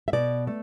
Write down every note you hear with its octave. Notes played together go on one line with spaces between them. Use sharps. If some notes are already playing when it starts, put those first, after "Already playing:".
E5
B2 D5
A3